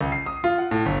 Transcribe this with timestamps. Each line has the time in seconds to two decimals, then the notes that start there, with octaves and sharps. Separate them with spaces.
0.01 C#2
0.12 C7
0.26 D#6
0.44 F4
0.58 F#5
0.71 A2
0.86 G1